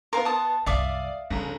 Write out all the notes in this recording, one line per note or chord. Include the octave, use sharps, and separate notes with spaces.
B3 A#4 F5 C6
A5 D#6
C2 F#2 D5 E5 F5 D6 D#6
G1 C#3 F3 A#5